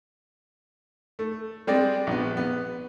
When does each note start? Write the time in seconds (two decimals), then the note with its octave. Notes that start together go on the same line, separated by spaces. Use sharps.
1.19 A3
1.67 G3 G#3 C4 D5
2.07 A#1 B3
2.37 B3